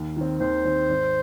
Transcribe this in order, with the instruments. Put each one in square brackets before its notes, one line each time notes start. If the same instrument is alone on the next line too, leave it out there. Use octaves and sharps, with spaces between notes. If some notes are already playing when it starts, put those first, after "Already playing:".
Already playing: [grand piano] D#2
D#3 C4
[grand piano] D#2 [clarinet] C5
[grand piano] D#3 C4
G#1